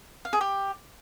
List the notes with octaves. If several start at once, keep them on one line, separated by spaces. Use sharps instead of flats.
F5
G#4
G4